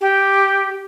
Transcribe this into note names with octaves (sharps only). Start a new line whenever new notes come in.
G4